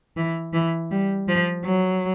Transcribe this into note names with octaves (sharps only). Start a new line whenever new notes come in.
E3
E3
G3
F3
F#3